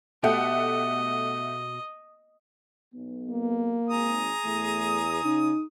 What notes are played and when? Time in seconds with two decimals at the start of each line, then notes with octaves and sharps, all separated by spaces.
0.24 B2 A3 G4 D#5 F#5
2.94 B1 B3
3.30 A#3
3.90 G#1 G#4 A#5 D#6
4.45 E2 A3
5.23 C#3 D#4